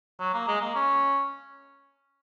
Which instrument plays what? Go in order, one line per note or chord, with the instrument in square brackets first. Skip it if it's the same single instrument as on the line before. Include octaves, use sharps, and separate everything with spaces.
[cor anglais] F#3
A#3
G#3
A#3
C#4